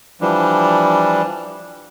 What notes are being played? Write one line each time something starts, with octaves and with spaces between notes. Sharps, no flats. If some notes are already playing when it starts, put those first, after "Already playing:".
E3 F3 G3 D4